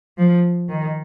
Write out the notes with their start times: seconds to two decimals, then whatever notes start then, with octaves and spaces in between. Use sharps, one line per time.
0.18 F3
0.69 D#3